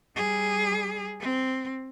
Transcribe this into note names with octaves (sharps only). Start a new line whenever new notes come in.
G3 G#4
C4